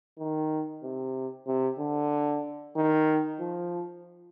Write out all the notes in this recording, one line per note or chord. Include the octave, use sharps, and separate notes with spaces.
D#3
C3
C3
D3
D#3
F3